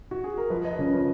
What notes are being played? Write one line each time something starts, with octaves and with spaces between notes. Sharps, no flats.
F#4
G#4
A#4
F3 B4
F3 D#5
B4
C#3 C#5
F3